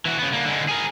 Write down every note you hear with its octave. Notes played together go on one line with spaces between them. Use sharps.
E3 F#4
C#3 B3
D3 A#3
D3 G#3
G#4 A#4